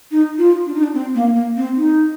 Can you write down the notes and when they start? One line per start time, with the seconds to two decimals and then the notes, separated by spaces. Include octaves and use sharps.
0.11 D#4
0.38 F4
0.66 D4
0.75 D#4
0.83 D4
0.94 C4
1.15 A#3
1.35 A#3
1.57 C4
1.77 D#4